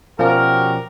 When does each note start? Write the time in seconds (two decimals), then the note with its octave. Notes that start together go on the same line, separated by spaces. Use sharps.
0.19 B2 F3 C#4 F#4 G4 A#4 D5